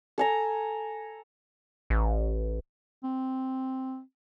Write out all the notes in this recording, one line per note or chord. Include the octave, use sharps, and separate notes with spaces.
A4 G#5 A#5
A1
C4